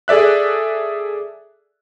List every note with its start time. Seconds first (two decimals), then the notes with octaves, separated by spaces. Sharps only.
0.08 G#4 A4 D5 E5 F#6